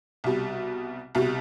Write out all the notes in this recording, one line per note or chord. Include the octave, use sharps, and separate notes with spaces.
C2 B2 G3
C2 B2 G3